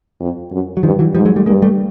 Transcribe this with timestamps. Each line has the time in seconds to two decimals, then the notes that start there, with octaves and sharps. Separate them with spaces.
0.20 F2
0.51 F#2
0.77 F#3
0.83 G2 D#3 F3
0.99 E3 F#3
1.15 G#2 F3 G3
1.25 F#3 G#3
1.36 G3 A3
1.46 G2 G#3 A#3
1.62 G3 A3